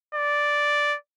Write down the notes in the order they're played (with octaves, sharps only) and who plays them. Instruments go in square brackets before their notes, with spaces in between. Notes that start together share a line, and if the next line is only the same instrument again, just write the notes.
[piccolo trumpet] D5